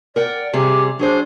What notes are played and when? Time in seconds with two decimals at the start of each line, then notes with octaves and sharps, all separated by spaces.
0.16 A#4 D5 F#5 G5
0.53 C3 G3 G4 G#4
0.99 F#3 D4 G#4 C5